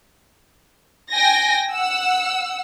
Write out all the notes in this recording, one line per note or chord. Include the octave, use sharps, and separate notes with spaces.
G5 G#5 A#6
F#5 E6